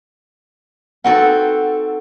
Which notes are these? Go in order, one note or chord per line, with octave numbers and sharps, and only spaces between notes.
C4 D#4 F#4 A4 B4 F#5